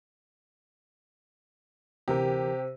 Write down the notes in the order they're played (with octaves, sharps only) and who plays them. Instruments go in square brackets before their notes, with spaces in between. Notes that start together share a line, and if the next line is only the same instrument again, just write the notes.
[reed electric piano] D2 E3 A#4 [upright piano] C3 [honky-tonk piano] G4 [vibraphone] C5